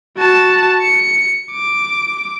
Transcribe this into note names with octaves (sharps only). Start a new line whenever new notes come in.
F#4 A5
C#7
D6